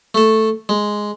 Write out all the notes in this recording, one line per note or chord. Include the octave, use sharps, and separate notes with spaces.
A3 A4
G#3